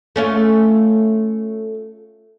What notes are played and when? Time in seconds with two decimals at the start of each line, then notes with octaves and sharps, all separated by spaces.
0.16 A3 C#4 F4